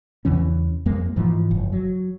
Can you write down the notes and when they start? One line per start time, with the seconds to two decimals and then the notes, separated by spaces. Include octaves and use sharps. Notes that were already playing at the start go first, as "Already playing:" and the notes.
0.25 E2 C#3 E3 C#4
0.86 F2 G#3 A#3
1.16 G#2 E3 F3
1.51 F#1
1.72 F#3